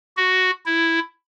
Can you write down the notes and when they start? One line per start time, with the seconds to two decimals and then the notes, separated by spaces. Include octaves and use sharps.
0.17 F#4
0.65 E4